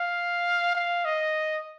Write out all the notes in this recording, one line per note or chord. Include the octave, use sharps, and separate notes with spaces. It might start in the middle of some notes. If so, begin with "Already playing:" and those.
Already playing: F5
F5
D#5